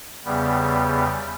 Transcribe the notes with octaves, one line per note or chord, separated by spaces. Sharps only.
E2 C#3 G3 B3